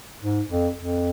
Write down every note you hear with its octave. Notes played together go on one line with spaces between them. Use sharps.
G#2
F2
F2